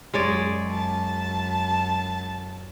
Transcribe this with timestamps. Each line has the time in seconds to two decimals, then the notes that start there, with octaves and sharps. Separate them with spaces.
0.14 F#2 G#3 C#5 D5
0.71 A5